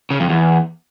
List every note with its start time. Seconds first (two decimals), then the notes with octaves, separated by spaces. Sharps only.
0.10 C#3
0.20 F2
0.29 E2